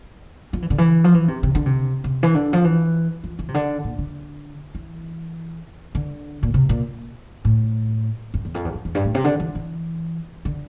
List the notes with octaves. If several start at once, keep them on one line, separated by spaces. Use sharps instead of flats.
F3
E3
D3
E3
F3
E3
C3
C3
D3
C3
C3
E3
D3
F3
E3
F3
E3
C3
D3
A#2
D3
E3
D3
A#2
C3
A#2
A2
F2
E2
F2
E2
F2
E2
G2
A2
C3
D3
E3
E3
D3